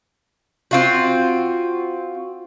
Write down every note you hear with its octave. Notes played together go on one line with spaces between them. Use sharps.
C4 F4 F#4